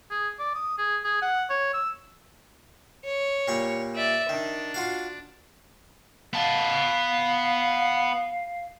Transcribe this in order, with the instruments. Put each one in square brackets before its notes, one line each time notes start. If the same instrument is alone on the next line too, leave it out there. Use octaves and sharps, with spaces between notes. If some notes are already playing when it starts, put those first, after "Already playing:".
[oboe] G#4
D5
D#6
G#4
G#4
F#5
C#5
E6
[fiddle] C#5
[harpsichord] A#2 G3 C#6
[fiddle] D5 E5
[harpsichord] D#3 [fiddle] D4
[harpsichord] F4 F#4 F5
[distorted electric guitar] B3 A5 [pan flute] F5